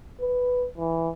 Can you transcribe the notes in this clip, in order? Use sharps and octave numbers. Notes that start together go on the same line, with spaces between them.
B4
E3